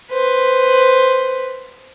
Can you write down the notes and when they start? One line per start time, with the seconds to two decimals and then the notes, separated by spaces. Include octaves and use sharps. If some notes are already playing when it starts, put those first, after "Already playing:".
0.12 B4 C5